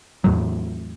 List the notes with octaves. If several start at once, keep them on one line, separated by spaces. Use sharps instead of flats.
E2 A2 F#3